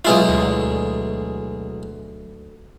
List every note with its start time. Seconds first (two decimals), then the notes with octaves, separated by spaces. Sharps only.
0.05 B1 G#3 E4 F4
0.29 D2